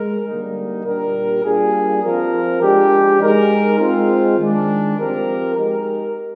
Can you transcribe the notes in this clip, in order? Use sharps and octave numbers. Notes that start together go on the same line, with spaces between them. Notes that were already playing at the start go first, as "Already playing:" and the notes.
Already playing: G#3 A#4
D3 G3 A#3 D#4
A#2 G3 D4 G4 A#4
G3 A#3 D4 F4 G#4
F3 C4 F4 A#4
F3 G#3 D4 G4
G#3 D#4 A#4
G#3 C4 F4
D#3 G#3 D4
F3 C4 G4 A#4
G#3 D#4 G4 A#4